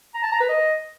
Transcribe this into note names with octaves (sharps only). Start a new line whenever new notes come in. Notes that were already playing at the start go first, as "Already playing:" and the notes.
A#5
A5
A#5
B4
D#5